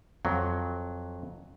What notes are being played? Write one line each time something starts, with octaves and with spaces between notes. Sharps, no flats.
F2 F#3